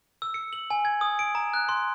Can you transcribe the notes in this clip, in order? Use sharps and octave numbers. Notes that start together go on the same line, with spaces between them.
E6
C#7
F#7
G#5
G#6
D#6
D7
A#5
F#6
C6